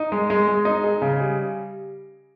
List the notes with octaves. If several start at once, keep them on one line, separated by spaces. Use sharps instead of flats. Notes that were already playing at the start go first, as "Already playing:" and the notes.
Already playing: D#4
G#3
G#3
G#3
D#4
G#4
C#3
G3